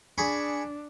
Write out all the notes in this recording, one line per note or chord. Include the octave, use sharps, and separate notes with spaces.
D4 G#4 B5 C#6